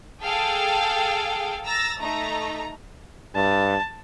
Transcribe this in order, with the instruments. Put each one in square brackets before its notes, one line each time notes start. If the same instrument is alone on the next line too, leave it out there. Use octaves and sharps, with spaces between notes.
[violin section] G#4 A4 F5 G5
A#5 E6 A6 A#6
A3 D#4 A#5
[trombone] G2 [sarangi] A5